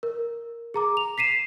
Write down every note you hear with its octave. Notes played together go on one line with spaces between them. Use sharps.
A#4
G#4 A#5 D6
F7
B6 C7 D#7 E7